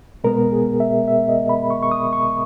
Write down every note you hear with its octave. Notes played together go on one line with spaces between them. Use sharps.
B2 G#3 B3 A#4
G#4
E5
E5
D#5
B5
C#6
C#6
D#6
C#6